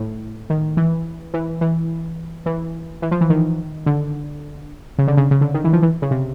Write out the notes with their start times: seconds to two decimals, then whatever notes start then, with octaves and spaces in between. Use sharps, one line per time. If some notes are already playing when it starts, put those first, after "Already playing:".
Already playing: A2
0.50 D#3
0.77 E3
1.34 E3
1.61 E3
2.46 E3
3.02 E3
3.11 F3
3.21 E3
3.30 D#3
3.86 D3
4.98 C#3
5.07 D3
5.17 C#3
5.31 C#3
5.41 D3
5.54 D#3
5.64 E3
5.73 F3
5.82 E3
6.02 C#3
6.11 C3